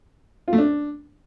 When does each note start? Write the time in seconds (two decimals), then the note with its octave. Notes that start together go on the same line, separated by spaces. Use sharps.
0.48 F4
0.53 A3
0.58 D4